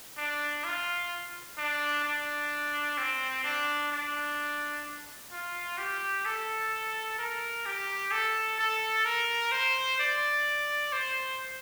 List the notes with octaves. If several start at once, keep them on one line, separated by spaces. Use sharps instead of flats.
D4
F4
D4
D4
C4
D4
D4
F4
G4
A4
A#4
G4
A4
A4
A#4
C5
D5
C5